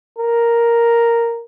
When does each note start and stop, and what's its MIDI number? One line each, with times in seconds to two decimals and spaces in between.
0.19 1.45 70